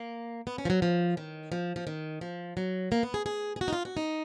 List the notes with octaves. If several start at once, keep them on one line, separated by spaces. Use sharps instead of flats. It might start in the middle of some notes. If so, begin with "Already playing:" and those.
Already playing: A#3
B3
C#4
F3
F#3
F3
D#3
F3
F3
D#3
F3
F#3
A#3
B3
G#4
G#4
G#4
F#4
D#4
F4
F#4
D#4